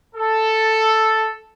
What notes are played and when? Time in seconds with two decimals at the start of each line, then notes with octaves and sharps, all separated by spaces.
0.15 A4